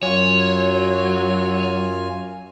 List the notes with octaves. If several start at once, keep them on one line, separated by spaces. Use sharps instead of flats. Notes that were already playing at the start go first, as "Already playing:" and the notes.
F#2 F#3 F4 C#5 G#5